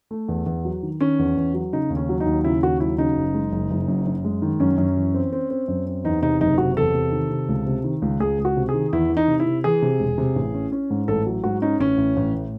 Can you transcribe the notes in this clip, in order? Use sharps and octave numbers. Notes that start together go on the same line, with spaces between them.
A3
E2
E2
F#3
D#3
D#3 C#4
E2
E2
F#3
C#3 D#4
D#2
C#4
F#3
D#4
D#2
C#3 E4
D#2 F#4
F#3 E4
C#3 D#4
F#1
G#3
F#1
F#1
F#2
F#2
G#3
D#3
F#2 C#4
F#2
E3
C4
C4
C4
F#2
C4
E2 D#4
C3 D#4
F#1 D#4
C3 F#4
E2 A4
C3
D#3
C3
C#2
C3
D#3
C#2
C#2 G#4
C#2
F#4
C3
G#4
D#3
E2 E4
E3
D#4
C3
E4
C3
E3 G#4
C3
E1
C3
A1
C#4
C#4
G#2
A1 A4
F#3
G#2 F#4
C#4 D#4
A1 C#4
A1
A1
A2